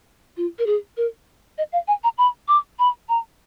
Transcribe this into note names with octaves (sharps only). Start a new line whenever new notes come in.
F4
A#4
G#4
A#4
D#5
F5
G#5
A#5
B5
D6
B5
A#5